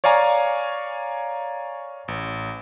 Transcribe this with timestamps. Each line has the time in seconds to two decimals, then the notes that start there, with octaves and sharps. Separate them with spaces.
0.04 C#5 D5 F5 G#5 A#5 C#6
2.08 A1